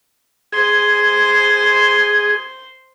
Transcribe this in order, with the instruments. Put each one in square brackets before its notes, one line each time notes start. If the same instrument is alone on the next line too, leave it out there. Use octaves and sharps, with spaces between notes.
[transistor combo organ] G#4 [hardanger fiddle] C5 C6